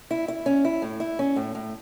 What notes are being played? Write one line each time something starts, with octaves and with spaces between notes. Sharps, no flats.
E4
E4
C#4
E4
A2
E4
C#4
A2
A2